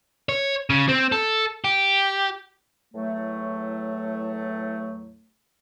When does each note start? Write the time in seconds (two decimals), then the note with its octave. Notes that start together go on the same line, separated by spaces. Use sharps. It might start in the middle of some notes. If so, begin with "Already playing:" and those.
0.29 C#5
0.70 C#3
0.89 C4
1.12 A4
1.64 G4
2.93 E2 A2 F#3 A3